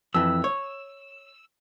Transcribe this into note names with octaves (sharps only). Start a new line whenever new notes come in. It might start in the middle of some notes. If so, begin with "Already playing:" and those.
F2 E3 E6
C#5